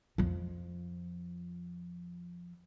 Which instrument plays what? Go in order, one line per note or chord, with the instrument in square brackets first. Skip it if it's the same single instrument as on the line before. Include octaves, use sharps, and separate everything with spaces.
[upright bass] F2 F3